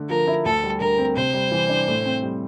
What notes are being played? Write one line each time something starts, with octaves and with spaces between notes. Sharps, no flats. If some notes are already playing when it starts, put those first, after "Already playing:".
Already playing: D3 A3
F3 A#4
E4
D2 A4
G3
D3 A#4
C4
C3 C5
G3
E3
D4
A2
C4
G3